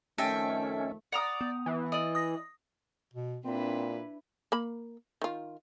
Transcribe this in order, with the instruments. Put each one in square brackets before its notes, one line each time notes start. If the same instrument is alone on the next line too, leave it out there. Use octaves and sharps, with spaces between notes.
[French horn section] F2 D#3 A3 [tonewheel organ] C#4 [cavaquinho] A4 [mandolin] D#5 E5 G5
[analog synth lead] D5 [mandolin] F#5 A#5 D#6
[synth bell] B3
[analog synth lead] E3
[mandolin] D5 D#5
[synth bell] D#6 A#6
[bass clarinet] B2
[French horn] A#2 [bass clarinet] C4 [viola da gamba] D4 E4 B4
[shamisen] A#3 B5
D#3 F4